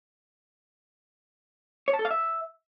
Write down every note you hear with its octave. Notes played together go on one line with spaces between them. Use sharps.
C#5
A5
A4
F5
E5